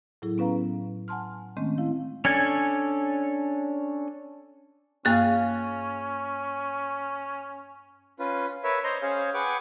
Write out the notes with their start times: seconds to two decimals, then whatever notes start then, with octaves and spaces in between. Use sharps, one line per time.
0.22 A2 F#3 E4 G#4
0.38 B3 C#4 B4 F5 A#5
1.08 F#5 G#5 A5 C6 F6
1.57 D#3 G#3 A3 C4 C#4
1.78 E4 F5
2.25 C#4 D4 A4 G#5
5.05 G2 A#3 C#4 G#4 F5 F#6
8.19 C#4 F4 B4
8.64 A#4 B4 C#5 E5
8.84 C5 C#5 D#5 A#5 C6
9.02 C#4 G#4 C5 C#5 F5
9.34 G#4 B4 F#5 G5 C#6 D6